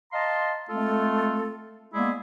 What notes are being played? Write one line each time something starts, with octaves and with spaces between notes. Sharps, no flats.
D#5 F5 A5 A#5 C6
G#3 A3 C4 F4 A4
G#3 A#3 B3 E4 G#4 D5